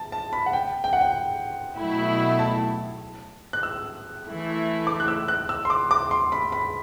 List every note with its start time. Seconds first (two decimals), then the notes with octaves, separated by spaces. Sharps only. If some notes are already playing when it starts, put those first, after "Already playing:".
Already playing: A5
0.12 A5
0.33 B5
0.46 F#5
0.53 G5
0.84 G5
0.93 F#5
1.01 G5
1.78 B2 F#3 A3 E4
2.39 A5
3.53 F#6
3.63 E6
4.26 E3 A3 E4
4.87 D6
5.00 F#6
5.08 E6
5.28 F#6
5.49 E6
5.65 C6
5.70 D6
5.91 D6
6.11 C6
6.32 B5
6.52 B5